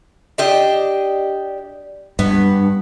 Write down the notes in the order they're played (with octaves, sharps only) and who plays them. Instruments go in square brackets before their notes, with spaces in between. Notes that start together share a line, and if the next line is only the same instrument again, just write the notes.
[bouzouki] D4 G4 D#5
[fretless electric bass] G2 [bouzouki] B3